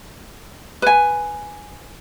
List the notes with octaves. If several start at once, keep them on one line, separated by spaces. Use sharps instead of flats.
B4 G#5